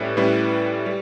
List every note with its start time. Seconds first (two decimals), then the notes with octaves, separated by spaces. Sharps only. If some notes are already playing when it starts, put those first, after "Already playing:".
Already playing: A2 G3 C#4 E4 B4
0.17 A2 G3 C#4 E4 B4
0.86 G3